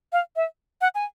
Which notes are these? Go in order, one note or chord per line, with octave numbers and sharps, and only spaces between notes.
F5
E5
F#5
G#5